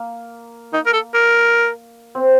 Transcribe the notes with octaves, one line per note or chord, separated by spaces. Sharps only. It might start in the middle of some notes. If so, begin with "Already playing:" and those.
Already playing: A#3
D#4
A#4
A4
A#4
C4